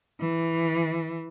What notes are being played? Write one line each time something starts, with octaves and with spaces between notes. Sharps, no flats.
E3